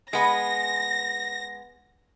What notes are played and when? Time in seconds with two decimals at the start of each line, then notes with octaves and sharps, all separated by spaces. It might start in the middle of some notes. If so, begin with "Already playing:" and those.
0.13 G#3 B3 A#6